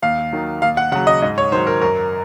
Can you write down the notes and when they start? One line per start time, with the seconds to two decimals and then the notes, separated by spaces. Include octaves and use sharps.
0.02 D#2 F5
0.32 D#3 F#3
0.62 D#2 F5
0.77 F#5
0.92 C#3 F#5
0.95 F#3
1.07 D#5
1.22 G#2 D#5
1.38 C#5
1.52 D#3 C5
1.55 F#3
1.67 A#4
1.82 F#2 A#4